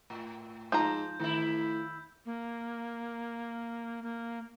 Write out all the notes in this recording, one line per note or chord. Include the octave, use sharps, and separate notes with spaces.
A2
G#2 F3 A#5 G6
A2 D#3 E4
A#3
A#3